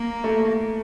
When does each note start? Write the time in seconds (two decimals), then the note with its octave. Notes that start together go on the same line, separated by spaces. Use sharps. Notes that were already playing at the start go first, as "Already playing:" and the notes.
Already playing: A#3
0.24 A3